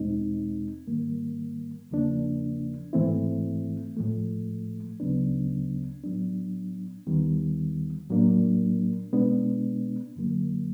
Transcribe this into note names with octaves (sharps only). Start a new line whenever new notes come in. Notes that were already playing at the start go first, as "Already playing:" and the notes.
Already playing: E2 B2 G#3 C4 D#4
G#2 D#3 G3 A#3
E2 C#3 F3 A#3 D4
G#2 E3 A3 C4 E4
A2 F3 A3
D2 C#3 F#3 B3 D4
A2 F#3 B3 D4
D#2 D#3 G3 B3
A2 F#3 A#3 D4
B2 G#3 B3 D4
F#2 D3 F#3 A#3